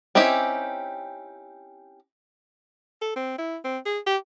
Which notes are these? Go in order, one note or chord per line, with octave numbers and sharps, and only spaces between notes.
C4 C#4 D#4 E4 G4
A4
C4
E4
C4
G#4
G4